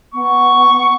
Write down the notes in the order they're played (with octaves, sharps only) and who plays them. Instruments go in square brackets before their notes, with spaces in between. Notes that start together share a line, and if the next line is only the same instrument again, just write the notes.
[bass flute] B3 [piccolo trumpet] C#6